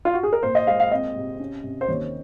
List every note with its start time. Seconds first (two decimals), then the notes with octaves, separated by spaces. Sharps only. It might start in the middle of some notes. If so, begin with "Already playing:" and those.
0.05 F4
0.14 F#4
0.23 G#4
0.33 A#4
0.43 A#2 C5
0.55 D#5
0.67 G#3 F5
0.80 F5
0.91 C4 D#5
1.16 C3
1.40 C#4
1.64 C3
1.81 C5
1.88 D#2 C#5